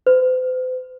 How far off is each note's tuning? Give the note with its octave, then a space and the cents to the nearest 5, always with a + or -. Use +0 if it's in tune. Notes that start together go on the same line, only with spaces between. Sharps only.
C5 -45